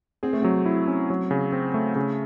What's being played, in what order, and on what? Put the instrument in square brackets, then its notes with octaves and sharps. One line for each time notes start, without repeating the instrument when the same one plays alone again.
[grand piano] C4 [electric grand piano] G#4
[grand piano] A3
[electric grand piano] F#3 [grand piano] C4
[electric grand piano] E4
C#4
F#3
C#3
C4
A3
[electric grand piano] C#3 [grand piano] C#4